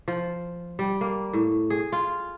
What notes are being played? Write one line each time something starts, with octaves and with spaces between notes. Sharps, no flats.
F3
G3
A#3
A2
G#4
F4